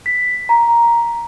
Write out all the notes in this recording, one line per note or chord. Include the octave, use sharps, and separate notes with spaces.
B6
A#5